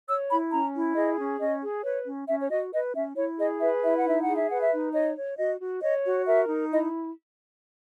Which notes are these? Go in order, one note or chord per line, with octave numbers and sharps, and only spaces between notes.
C#5 E6
E4 B5
C#4 A#5
E4
G#4 D#5
C#4
C#4 D#5
G#4
B4 C#5
C#4
C#4 E5
C#5
F#4 D#5
B4 D#5
C#4 E5
E4 C#5
G#4 D#5
B4 E5
E4 E5
F#5
D#4 E5
F#5
G#4
E5
B4 F#5
E5
D#4
C#5 D#5
C#5
F#4 D#5
F#4
C#5 D#5
F#4
A#4 E5
D#4
E4 D#5